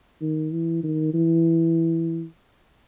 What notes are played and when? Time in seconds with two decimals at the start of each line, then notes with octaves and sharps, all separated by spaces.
0.21 D#3
0.52 E3
0.83 D#3
1.14 E3